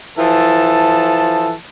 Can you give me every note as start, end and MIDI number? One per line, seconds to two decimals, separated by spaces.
0.18 1.55 52
0.18 1.55 53
0.18 1.55 69
0.18 1.55 81